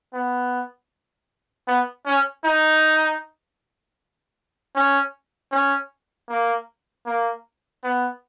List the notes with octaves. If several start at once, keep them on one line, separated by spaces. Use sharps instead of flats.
B3
B3
C#4
D#4
C#4
C#4
A#3
A#3
B3